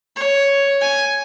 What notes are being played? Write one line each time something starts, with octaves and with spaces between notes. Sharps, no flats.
C#5
G#5